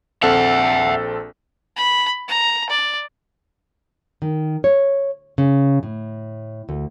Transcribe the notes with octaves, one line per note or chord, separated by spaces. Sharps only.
A#1 C4 A4 E5 F#5
B5
A#5
D5
D#3
C#5
C#3
A2
D2